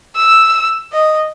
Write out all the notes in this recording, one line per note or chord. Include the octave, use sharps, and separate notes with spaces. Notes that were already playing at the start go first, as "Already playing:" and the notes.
E6
D#5